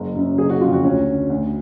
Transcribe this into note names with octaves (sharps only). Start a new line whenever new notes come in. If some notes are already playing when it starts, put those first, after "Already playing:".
Already playing: F#1
F#2 C#3
F#1 G#4
F#4
F2 C#3 F4
F#4
D2 C#4
D3
D2